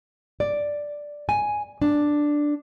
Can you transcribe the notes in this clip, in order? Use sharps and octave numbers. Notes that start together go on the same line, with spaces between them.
D5
G#5
D4